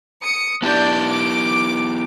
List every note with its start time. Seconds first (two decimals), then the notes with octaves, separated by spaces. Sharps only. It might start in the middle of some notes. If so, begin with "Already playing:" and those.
0.22 D#6 C#7
0.62 B3 D4 E4 G4 D5 G6
1.08 D6 D7